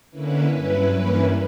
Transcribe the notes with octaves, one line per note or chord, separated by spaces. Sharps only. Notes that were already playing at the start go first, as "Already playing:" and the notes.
D3 A#3 C#4 E4 B4
G2 F#3 C#4 E4 B4
G2 E3 A#3 C#4 E4